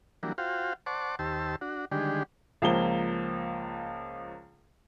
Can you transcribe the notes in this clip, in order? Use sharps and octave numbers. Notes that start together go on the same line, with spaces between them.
E3 F#3 G3 A#3 D4
F4 F#4 C5 F5 G5
C5 D5 F#5 A5 C#6 D6
D#2 G4 C5 A5 E6
D4 F#4
D3 D#3 G3 G#3 D4 G4
C#2 F3 A#3 G7